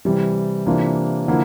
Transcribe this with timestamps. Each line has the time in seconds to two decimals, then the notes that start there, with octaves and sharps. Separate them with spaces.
0.05 C3 E3 G3
0.66 C3 E3 A#3 D4 F4
1.28 D3 F3 A#3 E4